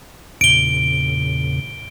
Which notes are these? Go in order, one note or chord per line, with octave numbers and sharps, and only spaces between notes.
E2 A#2 C#3 D7 G7